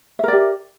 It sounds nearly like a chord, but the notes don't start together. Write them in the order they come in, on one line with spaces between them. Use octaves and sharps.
E5 A#4 D5 G4